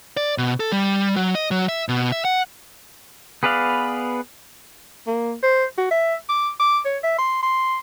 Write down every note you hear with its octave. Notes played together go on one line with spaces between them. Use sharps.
D5
B2
A4
G3
F#3
D#5
F#3
E5
B2
E5
F#5
B3 G#4 B4 D5 F5
A#3
C5
F#4
E5
D6
D6
C#5
E5
C6
C6